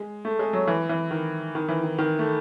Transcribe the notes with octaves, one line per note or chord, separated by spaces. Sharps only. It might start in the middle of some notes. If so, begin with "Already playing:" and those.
Already playing: G#3
A3
G#3
F#3
E3
E3
D#3
D#3
E3
D#3
D#3
A3